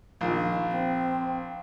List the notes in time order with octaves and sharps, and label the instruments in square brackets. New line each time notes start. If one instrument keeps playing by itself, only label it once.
[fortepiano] A#1 [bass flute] D#3
[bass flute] C4